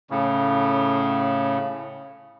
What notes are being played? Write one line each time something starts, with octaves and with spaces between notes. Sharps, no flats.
A2 C#3